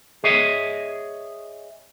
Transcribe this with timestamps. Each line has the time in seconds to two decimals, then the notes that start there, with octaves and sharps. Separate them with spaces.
0.24 G#4 C#5 D#5 E5